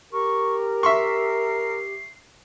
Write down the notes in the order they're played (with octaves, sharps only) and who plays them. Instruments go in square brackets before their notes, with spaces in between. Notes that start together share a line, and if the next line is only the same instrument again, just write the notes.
[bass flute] G4 [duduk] A#4 [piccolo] C#6
[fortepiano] E5 C6 C#6 [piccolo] C7